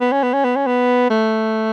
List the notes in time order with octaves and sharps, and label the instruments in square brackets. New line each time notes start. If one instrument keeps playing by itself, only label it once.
[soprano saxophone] B3
C#4
B3
C#4
B3
C#4
B3
A3